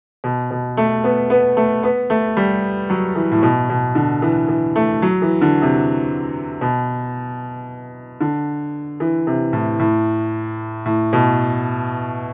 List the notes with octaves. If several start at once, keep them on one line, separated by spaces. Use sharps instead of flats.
B2
B2
A3
B3
B3
A3
B3
A3
G3
F#3
E3
A2
B2
B2
D3
E3
E3
A3
F#3
E3
D3
C3
B2
D3
E3
C3
A2
A2
A2
B2